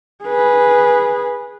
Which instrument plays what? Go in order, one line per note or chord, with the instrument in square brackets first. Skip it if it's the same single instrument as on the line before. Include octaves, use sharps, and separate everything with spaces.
[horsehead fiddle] G#4 B4